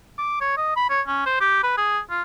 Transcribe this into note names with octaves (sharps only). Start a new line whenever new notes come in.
D6
C#5
D#5
B5
C#5
C#4
C5
G4
B4
G#4
F4